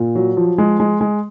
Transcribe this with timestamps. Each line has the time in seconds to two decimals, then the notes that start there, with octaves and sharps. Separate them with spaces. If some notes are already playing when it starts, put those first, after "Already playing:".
Already playing: A#2
0.15 F#3
0.37 F3
0.58 G#3
0.80 G#3
1.01 G#3